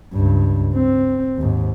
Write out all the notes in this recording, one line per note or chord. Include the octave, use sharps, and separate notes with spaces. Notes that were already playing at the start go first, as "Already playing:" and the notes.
C#2 G2
C4
D#2 G#2